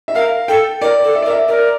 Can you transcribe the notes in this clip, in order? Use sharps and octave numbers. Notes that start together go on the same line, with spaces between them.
E5
A#4 F5
A4 G5
A#4 D5
A4
E5
D5
A#4
E5
A#4 D5